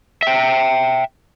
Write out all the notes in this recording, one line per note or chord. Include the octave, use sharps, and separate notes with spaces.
E5 G5